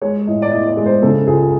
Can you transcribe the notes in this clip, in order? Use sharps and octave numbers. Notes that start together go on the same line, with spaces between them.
G#3 C#5
A2 D#5
D5
A2 D#5
D5
G#3
C5
C#3 A4
C#2 G#4